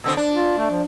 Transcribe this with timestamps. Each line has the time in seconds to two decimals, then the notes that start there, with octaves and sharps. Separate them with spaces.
0.04 B2 D3 C4 E6
0.17 D4 D5
0.33 F4
0.58 A3
0.71 F3